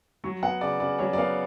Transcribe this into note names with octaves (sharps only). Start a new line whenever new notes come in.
F#3 C#6
B3 F#5
C#3 D5
C#3 D5
F#3 C#5
D5
B3 F5